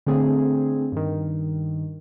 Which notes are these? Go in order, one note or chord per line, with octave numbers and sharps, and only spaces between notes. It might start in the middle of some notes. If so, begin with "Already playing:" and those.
D3 A3 C4 G#4
G2 D#3